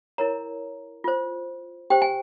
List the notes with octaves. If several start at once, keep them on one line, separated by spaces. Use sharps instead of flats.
E4 A#4 C#5 A#5
F4 C5
G4 C5 G5
G#5